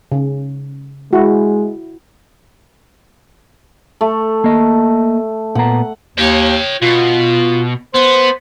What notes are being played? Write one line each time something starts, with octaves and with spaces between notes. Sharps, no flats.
C#3
G#3 E4 F#4
A3
A#3 D#5
A#2 B3 F#5 A#5
D#2 C#5 G5
B2 F4
B3 C5